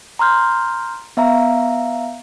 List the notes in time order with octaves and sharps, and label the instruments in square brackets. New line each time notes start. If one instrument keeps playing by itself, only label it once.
[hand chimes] A#5 C6 F6 G6
B3 E5 F5 A#5